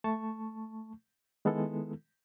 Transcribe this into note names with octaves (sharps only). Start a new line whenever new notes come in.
A3 A5 C#6
D#3 G#3 B3 E4 A4